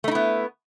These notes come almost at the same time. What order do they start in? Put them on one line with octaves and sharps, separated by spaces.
A3 D#4 E4 B3